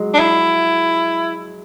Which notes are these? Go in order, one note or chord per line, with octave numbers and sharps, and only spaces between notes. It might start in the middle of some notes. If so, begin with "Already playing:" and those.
Already playing: F#3 G#3
D4
E4